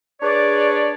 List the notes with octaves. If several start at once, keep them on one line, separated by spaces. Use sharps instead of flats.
D4 G#4 B4 C#5 D5